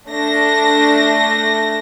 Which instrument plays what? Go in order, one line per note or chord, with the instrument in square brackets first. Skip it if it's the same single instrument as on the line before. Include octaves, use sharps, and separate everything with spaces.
[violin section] A3 D4 A#6